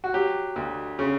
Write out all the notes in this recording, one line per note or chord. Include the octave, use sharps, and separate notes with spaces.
F#4
F#3 G4
D2
C#3